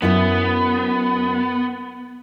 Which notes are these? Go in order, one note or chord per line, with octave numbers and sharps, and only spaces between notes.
F#2 B3 E4 E5